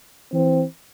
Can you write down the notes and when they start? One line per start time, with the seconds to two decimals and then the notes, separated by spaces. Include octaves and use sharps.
0.33 E3 C4